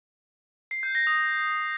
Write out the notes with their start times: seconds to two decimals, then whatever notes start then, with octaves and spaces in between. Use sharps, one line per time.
0.71 C7
0.83 G6
0.95 A#6
1.07 D#6